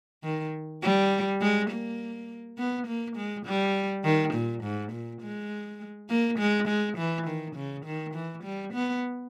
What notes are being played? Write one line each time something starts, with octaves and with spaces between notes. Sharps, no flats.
D#3
G3
G#3
A#3
B3
A#3
G#3
G3
D#3
A#2
G#2
A#2
G#3
A#3
G#3
G#3
E3
D#3
C#3
D#3
E3
G3
B3